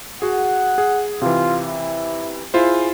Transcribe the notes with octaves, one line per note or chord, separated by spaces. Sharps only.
F#4 G#4 F#5
G#4
C3 E3 F4
E4
E4 F4 G#4 C5